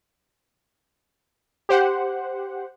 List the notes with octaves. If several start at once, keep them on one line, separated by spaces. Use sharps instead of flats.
G4 C5 F#5